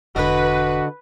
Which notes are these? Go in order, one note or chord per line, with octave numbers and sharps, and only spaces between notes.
E1 D3 F#4 B4 D#5